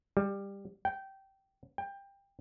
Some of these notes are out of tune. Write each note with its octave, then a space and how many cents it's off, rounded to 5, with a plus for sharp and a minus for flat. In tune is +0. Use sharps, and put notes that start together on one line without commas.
G3 +15
G5 -15
G5 +20